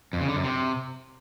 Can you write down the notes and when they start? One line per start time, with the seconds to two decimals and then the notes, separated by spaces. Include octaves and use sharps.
0.13 F2
0.21 C#3
0.28 D3
0.36 F#2
0.44 C3